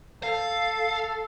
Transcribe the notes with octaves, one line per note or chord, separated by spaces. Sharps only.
A4 F5